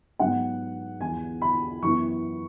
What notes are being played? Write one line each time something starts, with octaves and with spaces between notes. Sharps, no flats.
G#2 F#3 B3 F#5
E2 E3 B3 G#5
B5
F#2 E3 B3 C#6